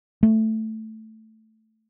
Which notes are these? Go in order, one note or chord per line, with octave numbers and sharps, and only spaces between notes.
A3